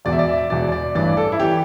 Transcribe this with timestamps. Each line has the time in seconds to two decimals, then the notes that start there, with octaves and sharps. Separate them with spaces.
0.05 E1 E2 B2 D5
0.12 E5
0.19 D5
0.28 E5
0.50 E1 E2 B2 D5
0.72 D5
0.95 A1 G2 E3 D5
1.17 A4
1.32 E4
1.40 E3 G4